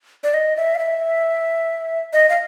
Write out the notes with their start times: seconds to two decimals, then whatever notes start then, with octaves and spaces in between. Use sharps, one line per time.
0.24 D5
0.34 D#5
0.57 E5
0.75 F5
0.79 E5
2.13 D#5
2.29 F5